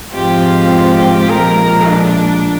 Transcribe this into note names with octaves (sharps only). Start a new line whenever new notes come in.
G#2 F3 G#3 C4 F4 G4
A#2 F3 G#3 A#4
D4